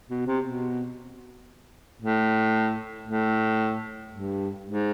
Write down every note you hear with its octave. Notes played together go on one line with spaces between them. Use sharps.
B2
C3
B2
A2
A2
G2
G#2